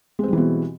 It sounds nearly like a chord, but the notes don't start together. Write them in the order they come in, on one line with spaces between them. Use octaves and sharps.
G#3 C4 G3 E3 B2